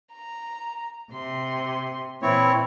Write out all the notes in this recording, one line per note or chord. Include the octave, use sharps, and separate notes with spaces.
A#5
C3 C6
A#2 E3 C4 E4 C#5